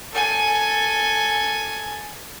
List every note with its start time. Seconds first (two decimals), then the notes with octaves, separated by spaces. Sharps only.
0.12 A4 G#5